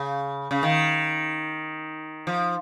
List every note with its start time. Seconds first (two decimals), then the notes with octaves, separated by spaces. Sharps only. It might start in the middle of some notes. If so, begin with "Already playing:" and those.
Already playing: C#3
0.51 C#3
0.63 D#3
2.27 F3